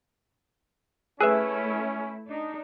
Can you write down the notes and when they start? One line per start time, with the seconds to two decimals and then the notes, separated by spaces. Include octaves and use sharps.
1.21 A3 C#4 E4 G#4 B4 E5 E6 F#6
2.28 D4 D#4